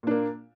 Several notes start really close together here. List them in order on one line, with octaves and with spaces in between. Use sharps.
A#2 D4 A#3